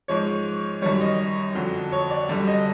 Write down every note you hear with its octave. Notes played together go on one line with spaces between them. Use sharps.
G#2 F3 G#3 C#5
F#2 D#3 G3 C#5
D#5
F2 D3 F#3
C#5
D5
F#2 D3 G3
D#5